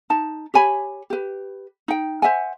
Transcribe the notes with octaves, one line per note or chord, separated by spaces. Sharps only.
D#4 A5
G4 C#5 G#5 B5
G4 B4
D#4 G5
C5 E5 F#5 G#5